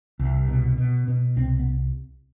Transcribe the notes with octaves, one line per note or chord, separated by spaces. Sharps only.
C2
B2
B2
B2
C2 C4
B3